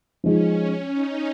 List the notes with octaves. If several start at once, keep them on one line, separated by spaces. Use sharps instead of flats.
F3 G#3 C#4 D#4
D#4